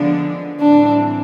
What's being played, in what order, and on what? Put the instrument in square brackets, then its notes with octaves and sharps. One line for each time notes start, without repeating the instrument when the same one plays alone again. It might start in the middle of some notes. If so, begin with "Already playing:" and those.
Already playing: [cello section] D3 F3 G#3 B3 D4
[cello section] A2 E3 G3 C4 [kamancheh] D4